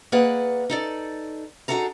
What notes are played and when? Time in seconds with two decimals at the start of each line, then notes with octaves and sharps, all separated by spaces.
0.12 A#3 G#4 B4 D5 F#5
0.70 D#4 A4 D5
1.68 D4 D#4 F#4 G#4 A4 A#5